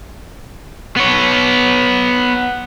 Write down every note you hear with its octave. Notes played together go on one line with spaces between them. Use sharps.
B3 C#5